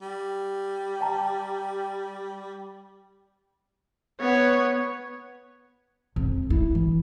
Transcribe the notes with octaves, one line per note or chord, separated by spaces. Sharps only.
G3
G5 A5 A#5
B3 C#5
F2
E4
E3